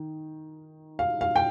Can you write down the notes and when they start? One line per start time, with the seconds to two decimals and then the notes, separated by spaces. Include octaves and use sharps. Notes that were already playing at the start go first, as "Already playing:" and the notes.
Already playing: D#3
0.99 F5
1.21 F5
1.36 G5